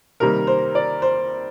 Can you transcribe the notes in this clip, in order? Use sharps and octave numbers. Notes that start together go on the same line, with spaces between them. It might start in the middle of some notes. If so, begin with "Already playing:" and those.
C3 D#3 G3 A#3 A#4
C5
D5
C5